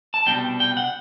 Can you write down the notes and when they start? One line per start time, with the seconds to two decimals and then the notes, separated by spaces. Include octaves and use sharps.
0.14 A5
0.26 C2 B2 G3 D4 G5
0.60 G5
0.77 F#5